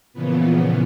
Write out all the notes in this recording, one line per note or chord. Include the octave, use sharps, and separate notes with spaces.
A#2 C#3 E3 F3 B3